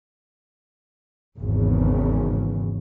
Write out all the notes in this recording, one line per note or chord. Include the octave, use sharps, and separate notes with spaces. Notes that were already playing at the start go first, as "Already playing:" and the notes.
G#1 E2 C#3